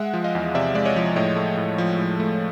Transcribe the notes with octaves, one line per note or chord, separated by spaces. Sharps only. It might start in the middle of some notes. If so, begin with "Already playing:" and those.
Already playing: G#3 E5 F#5
F3 F#5
D#5 F5
E2
C3 D5 E5
G#3 D5
C#5 D#5
F3
A2 C#5 D#5
A3
A2
F3
A2
A3